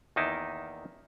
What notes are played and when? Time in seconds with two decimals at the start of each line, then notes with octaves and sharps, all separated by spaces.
0.16 E2 D#3 A#3 D#4 E4 A5